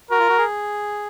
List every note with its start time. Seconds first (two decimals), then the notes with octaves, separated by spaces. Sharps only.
0.10 F#4 A#4
0.19 F4
0.29 F#4
0.38 G#4